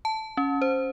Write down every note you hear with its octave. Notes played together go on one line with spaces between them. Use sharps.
A5
C#4
C5